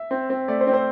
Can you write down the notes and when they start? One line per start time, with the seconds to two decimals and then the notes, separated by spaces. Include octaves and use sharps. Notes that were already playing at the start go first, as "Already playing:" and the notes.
Already playing: E5
0.11 C4
0.30 C4
0.48 A3 D5
0.61 C5
0.67 C4
0.73 C5